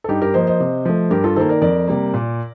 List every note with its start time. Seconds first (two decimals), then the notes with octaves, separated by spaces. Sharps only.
0.04 A4
0.09 G2 D#4 G4
0.22 G4 A#4
0.34 F3 A#3 C5 D#5
0.47 C5 D#5
0.60 C3
0.85 F3 A3
1.11 G2 G4 A#4
1.24 F4 A4
1.36 D#3 A#3 A4 C5
1.49 A#4 D5
1.62 F2 A#4 D5
1.87 C3 G3 A#3
2.14 A#2